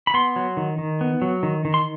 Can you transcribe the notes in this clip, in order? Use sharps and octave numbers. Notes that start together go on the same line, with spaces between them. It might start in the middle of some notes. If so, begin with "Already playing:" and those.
B5
B3 C6
F#3
D#3
D#3
B3
F#3
D#3
D#3
C6